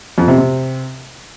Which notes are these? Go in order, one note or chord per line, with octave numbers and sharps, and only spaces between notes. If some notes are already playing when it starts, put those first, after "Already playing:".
F2
C3
C3